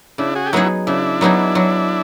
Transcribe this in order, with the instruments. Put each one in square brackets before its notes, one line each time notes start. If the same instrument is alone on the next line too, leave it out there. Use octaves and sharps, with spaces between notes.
[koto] C#3 [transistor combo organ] D4 E4
[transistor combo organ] F#4 G#4
G4
[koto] F#3 B3 D#4 G#4 [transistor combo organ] E4 F#4
[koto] C#3 [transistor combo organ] D4 E4
[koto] F#3 B3 D#4 G#4
F#3